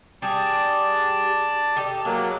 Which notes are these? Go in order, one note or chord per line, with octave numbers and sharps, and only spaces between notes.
G3 G4 G#4 D5 A5
D#4 G4 A4
F#3 G#3 A#3